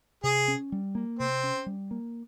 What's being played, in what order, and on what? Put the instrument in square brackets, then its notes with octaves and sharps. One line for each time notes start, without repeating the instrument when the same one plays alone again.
[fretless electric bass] C3 [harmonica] G#4
[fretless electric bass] C#4
G3
A#3
[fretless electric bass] C3 [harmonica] C4
[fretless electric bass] C#4
G3
A#3